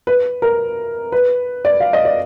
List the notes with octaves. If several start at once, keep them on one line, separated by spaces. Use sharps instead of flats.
B4
A#4
B4
D5
F5
D#5
D5